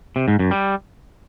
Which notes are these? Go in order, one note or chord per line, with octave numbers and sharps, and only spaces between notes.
C3
G#2
F#2
G3